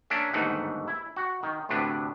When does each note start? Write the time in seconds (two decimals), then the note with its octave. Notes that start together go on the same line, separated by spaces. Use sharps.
0.10 A#3 C#4 D4 A#4 D5 E5
0.33 G1 D#2 G#2 A3 D#4 F#5
0.88 E4
1.16 F#4 F#5
1.43 D#3
1.69 D2 A2 C3 D4 B4